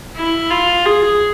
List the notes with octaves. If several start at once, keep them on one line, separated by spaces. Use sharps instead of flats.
E4
F4
G#4